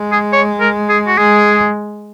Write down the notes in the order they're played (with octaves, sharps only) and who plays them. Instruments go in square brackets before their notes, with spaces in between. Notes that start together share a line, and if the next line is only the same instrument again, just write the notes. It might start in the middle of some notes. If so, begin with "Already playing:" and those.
Already playing: [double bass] G#3
[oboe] G#4
C#5
A#4
G#4
F#4
[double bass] G#3 [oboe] G#4